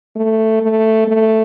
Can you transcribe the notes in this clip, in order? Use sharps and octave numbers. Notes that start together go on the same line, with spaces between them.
A3
A3
A3